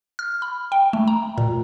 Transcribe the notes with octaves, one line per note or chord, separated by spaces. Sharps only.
F6
B5
G5
A3
A#5
A#2